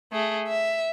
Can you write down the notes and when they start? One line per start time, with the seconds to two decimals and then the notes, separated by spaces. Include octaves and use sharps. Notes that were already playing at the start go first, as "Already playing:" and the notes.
0.12 A3 G#4
0.47 E5